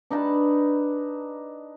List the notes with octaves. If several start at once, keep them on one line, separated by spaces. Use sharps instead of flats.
D4 D#4 B4 A5